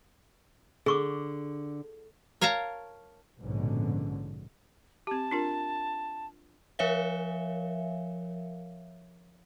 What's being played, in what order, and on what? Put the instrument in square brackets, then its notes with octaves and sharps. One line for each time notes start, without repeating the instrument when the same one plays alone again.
[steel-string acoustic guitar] D3 [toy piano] G#4 C#6 D6
[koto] A#4 C#5 F5 A5 A#5
[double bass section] A#1 G#2 B2 D3 C#4
[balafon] C4 G4 [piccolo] A5
[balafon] D4 F4 A#4
[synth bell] F3 A#4 C#5 E5 F5